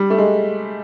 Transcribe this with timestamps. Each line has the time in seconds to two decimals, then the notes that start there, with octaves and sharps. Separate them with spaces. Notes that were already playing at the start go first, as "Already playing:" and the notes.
Already playing: G3
0.10 A3
0.18 G#3